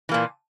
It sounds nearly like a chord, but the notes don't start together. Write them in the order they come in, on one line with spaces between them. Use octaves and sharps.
E3 A#3 A#2